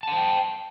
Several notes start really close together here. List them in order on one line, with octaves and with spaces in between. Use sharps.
A5 F#5 C5 G5